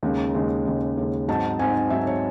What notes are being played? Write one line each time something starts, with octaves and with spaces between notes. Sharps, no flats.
D#2 C#3 G#3
D#2 C#3 G#3
D#2 C#3 G#3
D#2 C#3 G#3
G#2 F#3 C4 D#4 A5
G#2 F#3 C4 D#4 G#5
G#2 F#3 C4 D#4 E5
C#5